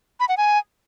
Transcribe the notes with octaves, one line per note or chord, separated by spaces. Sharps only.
B5
F#5
G#5